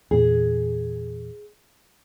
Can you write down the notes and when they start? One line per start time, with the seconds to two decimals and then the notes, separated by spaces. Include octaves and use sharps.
0.11 E2 A#2 G#4